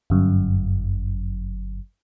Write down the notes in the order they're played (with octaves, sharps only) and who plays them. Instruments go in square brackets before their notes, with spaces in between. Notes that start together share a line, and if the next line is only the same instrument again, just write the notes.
[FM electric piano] G1 F#2